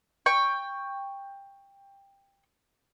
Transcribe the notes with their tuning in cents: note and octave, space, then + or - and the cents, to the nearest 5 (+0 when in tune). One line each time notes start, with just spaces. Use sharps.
G5 +15 C#6 +0